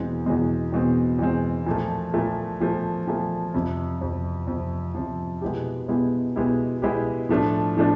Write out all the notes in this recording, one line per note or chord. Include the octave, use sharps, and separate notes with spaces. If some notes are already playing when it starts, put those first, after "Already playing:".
Already playing: E2 B2 G#3 C4
E2 B2 G#3 C4
E2 B2 G#3 C4
E2 B2 G#3 C4
A#2 F3 A3
A#2 F3 A3
A#2 F3 A3
A#2 F3 A3
F2 C3 F3
F2 C3 F3
F2 C3 F3
F2 C3 F3
B2 G#3 B3 E4 G4
B2 G#3 B3 E4 G4
B2 G#3 B3 E4 G4
B2 G#3 B3 E4 G4
A2 F3 A3 D4
A2 F3 A3 D4